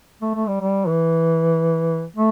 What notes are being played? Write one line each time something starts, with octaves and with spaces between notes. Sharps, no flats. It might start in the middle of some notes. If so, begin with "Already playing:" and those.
A3
A3
G3
G3
E3
A3